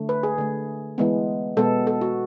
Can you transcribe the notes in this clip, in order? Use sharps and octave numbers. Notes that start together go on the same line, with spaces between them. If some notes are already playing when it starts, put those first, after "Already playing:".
Already playing: D3 A3
B4
G#4
D3 A3
E3 G#3 B3
B2 G#3 B3 A4
A4
F#4